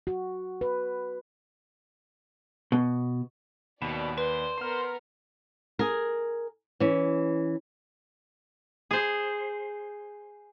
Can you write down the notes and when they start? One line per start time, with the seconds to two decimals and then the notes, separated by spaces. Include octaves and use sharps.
0.07 F#4
0.61 B4
2.72 B2
3.82 D#2 B2 D5 B5 E7
4.18 B4 C5
4.58 B3 A#4 C6 F6
5.79 G#4 A#4
6.80 E3 C#4
8.91 G#4 C5